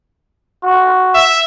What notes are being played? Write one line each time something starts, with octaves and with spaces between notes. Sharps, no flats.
F#4
E5